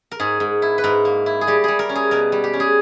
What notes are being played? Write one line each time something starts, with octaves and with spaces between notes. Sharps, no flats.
A#4
G#2 G#4
G#2
E4
B4
G#2 A#4
A#3
E4
G#4
G3 G4
G3 G#4
A#4
C#4
G#4
B2 A#4
G3
G4
C#4
G#4